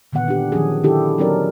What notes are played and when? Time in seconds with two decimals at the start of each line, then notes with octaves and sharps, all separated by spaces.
0.13 A#2 D3 D#3 B3 F#5
0.28 D4 G4
0.52 D#3 F3 F#3 C#4 G#4
0.83 D3 D#3 D4 E4 G4 A4
1.18 F#3 B3 C#4 D#4 A#4 D5